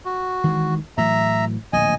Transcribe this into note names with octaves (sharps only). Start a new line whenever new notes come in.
F#4
D#3 E3 G#3
A2 E3 F#3 E5 A#5
D1 A#1 D#5 G#5